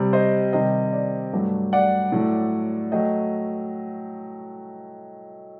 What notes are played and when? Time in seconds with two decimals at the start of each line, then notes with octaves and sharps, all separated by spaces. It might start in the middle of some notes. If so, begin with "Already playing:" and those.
Already playing: C3 G3
0.13 C5 D#5
0.53 C3 D#3 G3 D#5 G5
0.93 D5
1.33 G2 F#3 A3
1.73 D5 F#5
2.12 A2 F#3 A3
2.92 F#3 A3 D#5 G5